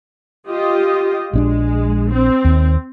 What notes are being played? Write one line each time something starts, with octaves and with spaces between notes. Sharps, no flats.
F4 G4 D#5
A#1 G#3 C#4 D4
C4
D#2